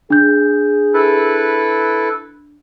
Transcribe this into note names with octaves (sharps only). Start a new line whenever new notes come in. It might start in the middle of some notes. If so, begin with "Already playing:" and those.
D4 G#4 G6
E4 A4 B4